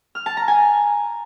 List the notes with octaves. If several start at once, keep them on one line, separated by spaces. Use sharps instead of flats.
F6
A5
A#5
G#5